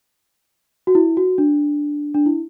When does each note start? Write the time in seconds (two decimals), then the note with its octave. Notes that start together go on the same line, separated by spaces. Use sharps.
0.87 F#4
0.95 E4
1.17 F#4
1.38 D4
2.14 D4
2.26 E4